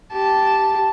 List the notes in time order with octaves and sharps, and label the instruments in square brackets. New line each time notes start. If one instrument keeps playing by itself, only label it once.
[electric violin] G4 A5